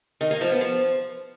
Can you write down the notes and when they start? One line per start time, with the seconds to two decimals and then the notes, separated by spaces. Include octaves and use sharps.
0.21 D#3
0.31 A#3
0.41 F3
0.51 B3
0.61 F3